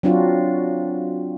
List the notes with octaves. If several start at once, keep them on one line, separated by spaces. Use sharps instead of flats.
F#3 C4 D4 F4 F#4